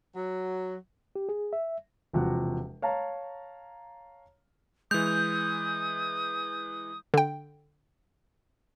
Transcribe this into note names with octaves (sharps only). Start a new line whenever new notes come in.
F#3
G4
G#4
E5
E1 C3 F3 F#4 F#5
C#5 F5 A5 A#5
E3 G#3 D#6 G6
D3 G5